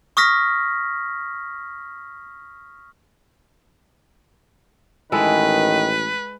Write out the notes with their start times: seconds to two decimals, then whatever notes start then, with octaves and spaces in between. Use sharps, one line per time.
0.17 C#6 D#6 F6 A#6 B6
5.12 A1 D#3 G#3 E4 A4 B4